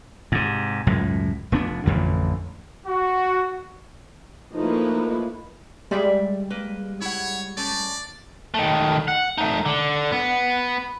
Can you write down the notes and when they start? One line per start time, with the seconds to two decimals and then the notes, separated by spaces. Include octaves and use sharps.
0.32 G#2 C3
0.87 C#2 F#2 A2
1.52 F1 B3 D4
1.86 A1 F2 D3
2.86 F#4
4.54 F3 A3 A#3 D#4 E4 B4
5.91 G3 G#3 D5 E5 G5
6.50 A#3 B4
7.01 E4 C#5 F#5
7.57 A3 C#4 D5
8.54 D#3 A3
9.08 F#5
9.38 A3 D#4
9.66 D3
10.12 B3